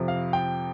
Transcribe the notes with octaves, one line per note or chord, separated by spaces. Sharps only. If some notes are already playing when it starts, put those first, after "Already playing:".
Already playing: F2 C3 F3
F5
G5